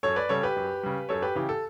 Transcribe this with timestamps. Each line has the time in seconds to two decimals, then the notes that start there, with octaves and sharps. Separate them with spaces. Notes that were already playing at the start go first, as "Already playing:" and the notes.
0.03 F#2 A4 C#5
0.16 B4 D5
0.29 C#3 G3 A4 C#5
0.43 G4 B4
0.56 F#2
0.83 C#3 G3
1.09 F#2 A4 C#5
1.22 G4 B4
1.35 C#3 E3 G4
1.49 A4